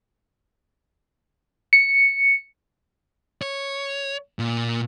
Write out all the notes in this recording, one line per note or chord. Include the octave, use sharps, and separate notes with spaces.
C#7
C#5
A#2